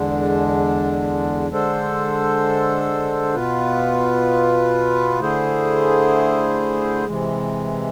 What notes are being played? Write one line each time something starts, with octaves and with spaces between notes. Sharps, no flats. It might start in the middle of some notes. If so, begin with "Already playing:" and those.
Already playing: E2 D3 G#3 D4
D3 G#3 D4 A4 C5
B2 B3 F4 B4
D3 A3 E4 G#4 C5
C3 E3 G#3